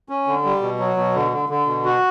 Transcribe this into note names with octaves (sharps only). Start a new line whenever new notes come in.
C#4
D3
G3
B2
F#3
B2
D3
D3
D3
B2
F#4